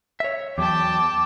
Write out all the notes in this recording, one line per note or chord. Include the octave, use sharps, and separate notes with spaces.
C#5 E5
E2 F#3 G5 A5 D6